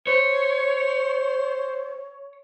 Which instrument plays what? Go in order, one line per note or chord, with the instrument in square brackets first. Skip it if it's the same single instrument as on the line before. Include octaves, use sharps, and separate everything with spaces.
[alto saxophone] C5 [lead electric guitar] C#5